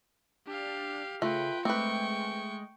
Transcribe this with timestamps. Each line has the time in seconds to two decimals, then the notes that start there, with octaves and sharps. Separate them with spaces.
0.47 D4 G4 F5
1.22 C#3 A3 F4 B4 G5
1.65 G#3 A3 C4 B4 G5 C#6